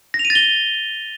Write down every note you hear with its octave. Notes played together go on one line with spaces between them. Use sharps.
A#6
F7
D#7
A6
G7